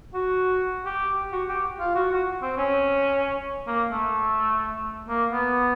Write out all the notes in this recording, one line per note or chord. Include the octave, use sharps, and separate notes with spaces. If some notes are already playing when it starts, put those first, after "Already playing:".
F#4
G4
F#4
G4
F4
F#4
F#4
C4
C#4
A#3
A3
A#3
B3